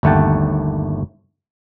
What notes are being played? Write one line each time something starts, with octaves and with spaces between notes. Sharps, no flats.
G1 D#2 A3 F#5 G5 A5